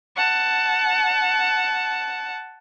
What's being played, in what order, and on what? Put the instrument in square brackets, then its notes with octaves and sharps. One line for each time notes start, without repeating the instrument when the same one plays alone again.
[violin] F#5 A5